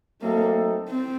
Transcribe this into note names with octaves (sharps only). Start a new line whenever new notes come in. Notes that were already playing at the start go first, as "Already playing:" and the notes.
F#3 A3 A#3 C4 D#4 A4
C4